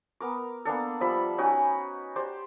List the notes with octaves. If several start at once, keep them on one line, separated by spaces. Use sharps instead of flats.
B3 A#4 D6
A#3 B3 D4 A4
F3 G3 E5 B5
C#4 D#4 F#4 G#5
G4 C5 D5